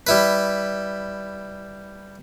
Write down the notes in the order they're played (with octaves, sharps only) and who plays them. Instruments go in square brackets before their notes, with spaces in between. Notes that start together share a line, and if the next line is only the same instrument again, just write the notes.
[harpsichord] G3 E4 B4